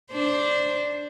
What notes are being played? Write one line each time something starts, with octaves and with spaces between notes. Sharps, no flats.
D4 C5